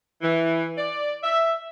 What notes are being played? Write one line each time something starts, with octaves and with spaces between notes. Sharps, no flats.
E3
D5
E5